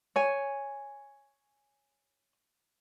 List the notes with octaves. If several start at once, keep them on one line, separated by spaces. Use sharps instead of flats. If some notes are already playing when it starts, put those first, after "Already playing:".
C#5 G#5